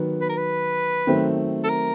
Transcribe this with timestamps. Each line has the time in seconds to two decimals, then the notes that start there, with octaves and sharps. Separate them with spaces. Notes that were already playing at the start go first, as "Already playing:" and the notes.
Already playing: D#3 F#3 B3
0.22 B4
0.29 A#4
0.37 B4
1.07 D#3 F#3 A3 C4
1.64 A4
1.69 A#4